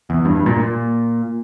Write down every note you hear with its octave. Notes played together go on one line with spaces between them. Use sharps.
E2
G2
G2
A#2
A#2